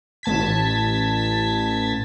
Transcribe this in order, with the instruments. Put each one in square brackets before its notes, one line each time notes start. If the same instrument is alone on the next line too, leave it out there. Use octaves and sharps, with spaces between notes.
[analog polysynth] A1 A5 G#6 B6